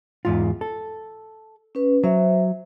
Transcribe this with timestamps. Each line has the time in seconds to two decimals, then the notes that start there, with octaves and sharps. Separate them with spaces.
0.25 E2 G#2 F4
0.61 A4
1.75 C#4 B4
2.04 F#3 C5 E5